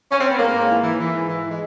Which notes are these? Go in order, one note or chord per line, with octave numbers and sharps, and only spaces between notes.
C#4
C4
B3
G#2 A#3
G#2
E3
E3
E3
G#2
E3
G#3